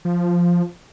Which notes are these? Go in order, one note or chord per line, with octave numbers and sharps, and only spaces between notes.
F3